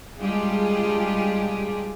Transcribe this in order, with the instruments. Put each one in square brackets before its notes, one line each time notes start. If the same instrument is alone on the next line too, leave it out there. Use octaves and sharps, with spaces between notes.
[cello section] G3 G#3 D4 F4 G4 G#4